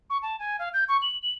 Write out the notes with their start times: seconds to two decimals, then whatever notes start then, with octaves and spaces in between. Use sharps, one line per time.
0.10 C#6
0.22 A5
0.39 G#5
0.59 F5
0.73 G6
0.88 C#6
1.02 F#7
1.22 F#7